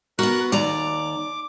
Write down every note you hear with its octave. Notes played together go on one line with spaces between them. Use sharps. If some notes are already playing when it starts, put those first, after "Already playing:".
B3 F#4 A#4 F#6
D#2 D5 A#5 D6